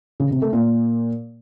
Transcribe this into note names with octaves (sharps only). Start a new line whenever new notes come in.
C#3
C3
A3
A#2